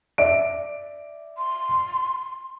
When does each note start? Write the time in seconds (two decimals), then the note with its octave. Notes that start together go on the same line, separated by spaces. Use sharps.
0.18 D5 E5 D7
1.38 C6